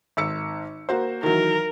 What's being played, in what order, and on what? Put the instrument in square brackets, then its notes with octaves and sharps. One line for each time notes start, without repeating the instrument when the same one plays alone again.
[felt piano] G#1 E6 C#7
A#3 F#4 C5
[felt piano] D#3 E3 F#3 [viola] A#4